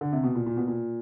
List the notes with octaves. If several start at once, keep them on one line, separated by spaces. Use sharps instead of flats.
D3
C3
B2
A#2
A#2
B2
A#2